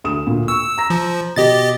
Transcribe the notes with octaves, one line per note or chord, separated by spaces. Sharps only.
D2 D#6 E7
D2 A#2
C#6 E6
A#5 A#6
F3
B2 G4 D#5 A6